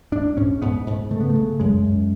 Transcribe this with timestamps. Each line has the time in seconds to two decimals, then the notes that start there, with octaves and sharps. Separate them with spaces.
0.12 G#2 D4
0.37 G#2 C#4
0.62 G#2 B3
0.87 G#2
1.11 C#3 A3
1.20 B3
1.29 A3
1.35 C#3
1.60 F#2 G#3
1.84 F#2